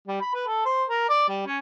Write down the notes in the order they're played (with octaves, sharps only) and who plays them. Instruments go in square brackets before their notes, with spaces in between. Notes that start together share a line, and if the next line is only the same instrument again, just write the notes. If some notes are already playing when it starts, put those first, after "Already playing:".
[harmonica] G3
B5
B4
A4
C5
A#4
D5
G3
C#4